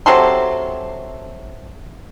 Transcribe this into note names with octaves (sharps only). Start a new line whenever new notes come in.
C3 F#3 A4 C6